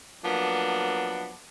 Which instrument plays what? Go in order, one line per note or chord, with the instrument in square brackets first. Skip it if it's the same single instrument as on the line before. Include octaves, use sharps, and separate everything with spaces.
[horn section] F3 F#3 A#3 B3 D4